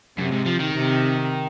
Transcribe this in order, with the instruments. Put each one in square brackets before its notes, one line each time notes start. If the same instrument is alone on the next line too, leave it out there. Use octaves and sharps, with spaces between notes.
[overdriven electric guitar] F#2 [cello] C3
[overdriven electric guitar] G#2
F3
D#3
[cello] C3